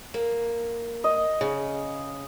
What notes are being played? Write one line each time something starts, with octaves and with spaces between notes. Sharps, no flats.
A#3
D#5
C#3